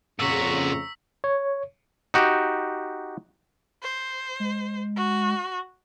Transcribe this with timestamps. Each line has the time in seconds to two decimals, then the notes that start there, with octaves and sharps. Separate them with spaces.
0.20 F2 A#2 C#3 F#4 A#5 C#6 E6 B6
1.24 C#5
2.14 D#4 F#4 G4
3.83 C5
4.40 G#3
4.96 F#4